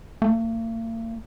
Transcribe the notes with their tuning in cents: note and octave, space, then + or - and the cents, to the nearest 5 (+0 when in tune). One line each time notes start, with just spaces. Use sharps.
A#3 -45